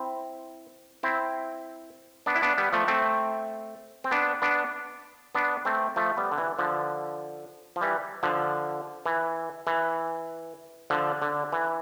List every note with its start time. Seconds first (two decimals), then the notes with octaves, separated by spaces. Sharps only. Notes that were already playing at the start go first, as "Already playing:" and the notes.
Already playing: C4 E4
1.03 C4 E4
2.26 B3 D4
2.35 E4
2.42 B3 D4
2.58 G3 B3
2.73 F3 A3
2.88 A3 C4
4.04 C4
4.11 B3 D4
4.42 B3 D4
5.35 B3 D4
5.65 A3 C4
5.96 F3 A3
6.17 G3 B3
6.32 D3
6.38 E3
6.59 D3 F3
7.76 F3
7.81 E3 G3
8.23 D3 F3
9.06 E3
9.67 E3
10.90 D3 F3
11.22 D3
11.52 E3